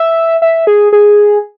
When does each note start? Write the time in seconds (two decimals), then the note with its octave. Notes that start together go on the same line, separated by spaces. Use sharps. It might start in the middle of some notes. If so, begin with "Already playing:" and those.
Already playing: E5
0.42 E5
0.67 G#4
0.93 G#4